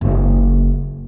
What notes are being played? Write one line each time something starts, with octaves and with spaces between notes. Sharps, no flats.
F#1